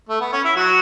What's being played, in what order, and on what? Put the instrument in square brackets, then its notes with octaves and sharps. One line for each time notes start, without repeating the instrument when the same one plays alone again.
[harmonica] A3
B3
C#4
E4
F#3 F#4